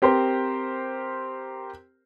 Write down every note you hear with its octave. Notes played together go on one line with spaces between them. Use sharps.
C4 G4 A#4 C5